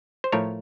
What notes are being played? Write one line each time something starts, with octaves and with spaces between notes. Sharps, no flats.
C5
A2 F3 A3 A#4 C#5